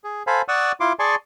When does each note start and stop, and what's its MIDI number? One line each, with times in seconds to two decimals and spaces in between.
0.04 0.23 68
0.27 0.42 69
0.27 0.42 72
0.27 0.42 77
0.27 0.42 80
0.27 0.42 83
0.48 0.72 74
0.48 0.72 78
0.48 0.72 85
0.48 0.72 87
0.48 0.72 88
0.48 0.72 90
0.80 0.93 64
0.80 0.93 65
0.80 0.93 84
0.80 0.93 86
0.99 1.15 68
0.99 1.15 74
0.99 1.15 80
0.99 1.15 81
0.99 1.15 84
0.99 1.15 85